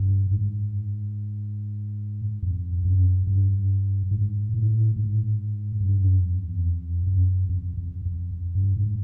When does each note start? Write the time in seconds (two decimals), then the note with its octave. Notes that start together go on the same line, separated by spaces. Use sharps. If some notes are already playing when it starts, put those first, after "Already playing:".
Already playing: G2
0.31 G#2
2.43 F2
2.85 F#2
3.27 G2
4.11 G#2
4.54 A2
4.96 G#2
5.80 G2
6.02 F#2
6.22 F2
6.44 E2
6.65 F2
7.07 F#2
7.49 F2
7.77 F2
8.06 F2
8.55 G2
8.76 G#2